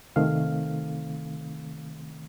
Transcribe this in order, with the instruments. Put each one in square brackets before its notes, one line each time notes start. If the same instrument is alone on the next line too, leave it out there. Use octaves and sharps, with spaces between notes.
[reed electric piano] C2 C3 D#3 A3 C4 F5